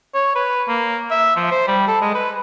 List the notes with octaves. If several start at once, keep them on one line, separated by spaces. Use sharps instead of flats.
C#5
B4
A#3
E5
F3
C5
G3
A4
G#3
B4